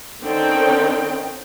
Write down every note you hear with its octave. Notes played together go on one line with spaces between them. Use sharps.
D3 D#3 C4 C#4 D#4 G5